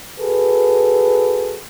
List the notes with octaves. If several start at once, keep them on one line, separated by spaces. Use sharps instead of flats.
F#4 G#4 A4 B4